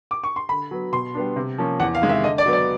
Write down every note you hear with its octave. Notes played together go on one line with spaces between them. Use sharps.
D6
C#6
C6
D3 B5
F#3 B3
B2 C6
G3 B3 D4
C3
F3 A#3 C#4
E2 F#5
F5
C3 D#3 G#3
E5
D3 D#5
D5
F#3 B3
D5